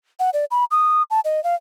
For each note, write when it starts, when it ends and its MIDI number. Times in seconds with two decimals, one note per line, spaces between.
0.20 0.30 78
0.33 0.45 74
0.51 0.65 83
0.71 1.03 87
1.11 1.20 81
1.25 1.43 75
1.44 1.55 77